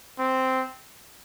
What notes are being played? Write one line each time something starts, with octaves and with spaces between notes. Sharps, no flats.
C4